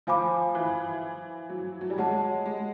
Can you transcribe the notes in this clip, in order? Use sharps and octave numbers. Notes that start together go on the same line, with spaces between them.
F3 C5 F5 G#5 B5 D6
E3
F#3
F#3
G3
G#3 G#4 C#5 F#5 A5
G#3